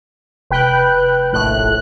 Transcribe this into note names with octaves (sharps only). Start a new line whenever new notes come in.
F1 B4 G5 F#6
A#1 A2 F#6